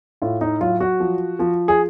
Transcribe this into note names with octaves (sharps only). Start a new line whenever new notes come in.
A2 F4
D#4
F#3 F4
F#4
F3
F3
G#4